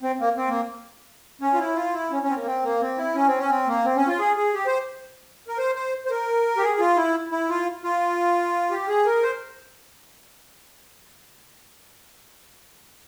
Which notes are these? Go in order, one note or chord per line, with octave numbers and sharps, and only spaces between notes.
C4
A#3
C4
A#3
C#4
F4
E4
F4
E4
C#4
C#4
C4
A#3
C4
A#3
C4
E4
C#4
C4
C#4
C4
A#3
C4
C#4
F4
G#4
G#4
G4
C5
A#4
C5
C5
C5
A#4
G4
G#4
F4
E4
E4
F4
F4
G4
G#4
A#4
C5